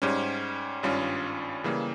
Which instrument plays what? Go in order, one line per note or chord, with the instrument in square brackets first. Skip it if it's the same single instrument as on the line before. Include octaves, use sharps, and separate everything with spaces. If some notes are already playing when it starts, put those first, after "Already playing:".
[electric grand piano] G#2 G3 C#4
G#1 G2 G3 C#4 F4
C#3 E3 G3 A#3